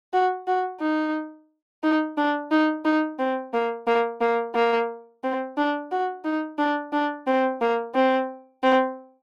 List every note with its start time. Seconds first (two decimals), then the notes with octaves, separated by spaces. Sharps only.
0.13 F#4
0.48 F#4
0.81 D#4
1.83 D#4
2.17 D4
2.51 D#4
2.85 D#4
3.19 C4
3.54 A#3
3.87 A#3
4.21 A#3
4.55 A#3
5.24 C4
5.57 D4
5.91 F#4
6.25 D#4
6.59 D4
6.93 D4
7.27 C4
7.61 A#3
7.95 C4
8.63 C4